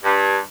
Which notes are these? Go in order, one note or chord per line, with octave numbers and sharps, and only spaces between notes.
G2